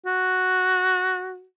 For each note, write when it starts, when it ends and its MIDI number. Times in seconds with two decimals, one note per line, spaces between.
0.06 1.44 66